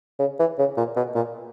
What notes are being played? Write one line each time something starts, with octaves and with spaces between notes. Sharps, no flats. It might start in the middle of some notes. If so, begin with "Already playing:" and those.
C#3
E3
C#3
A#2
B2
A#2